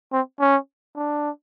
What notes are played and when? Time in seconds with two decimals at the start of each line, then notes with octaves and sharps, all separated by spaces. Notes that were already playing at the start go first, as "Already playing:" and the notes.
0.12 C4
0.40 C#4
0.96 D4